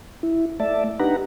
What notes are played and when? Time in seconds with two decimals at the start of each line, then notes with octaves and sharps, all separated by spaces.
0.23 E4
0.60 A3 D5 E5 A5
1.00 D4 D#4 G4 B4 F#5 A#5